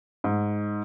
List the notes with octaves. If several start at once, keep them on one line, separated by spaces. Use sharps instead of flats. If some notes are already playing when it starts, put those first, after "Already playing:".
G#2